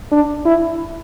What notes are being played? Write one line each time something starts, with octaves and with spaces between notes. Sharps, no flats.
D4
E4